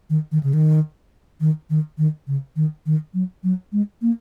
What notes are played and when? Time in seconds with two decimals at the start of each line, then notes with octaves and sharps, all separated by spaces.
0.10 D#3
0.32 D#3
0.43 C#3
0.54 D#3
1.40 D#3
1.70 D#3
1.98 D#3
2.27 C#3
2.56 D#3
2.86 D#3
3.14 F#3
3.44 F#3
3.72 G#3
4.02 A#3